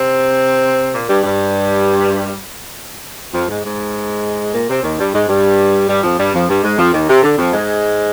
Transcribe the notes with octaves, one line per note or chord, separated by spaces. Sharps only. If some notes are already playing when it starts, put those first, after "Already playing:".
Already playing: C3 C4
A#2 A#3
G2 G3
G2 G3
F2 F3
G#2 G#3
G#2 G#3
A#2 A#3
C3 C4
D#2 D#3
G2 G3
G#2 G#3
G2 G3
G2 G3
F2 F3
G2 G3
F2 F3
G2 G3
G#2 G#3
F2 F3
D#2 D#3
C3
D3
F2 F3
G#2 G#3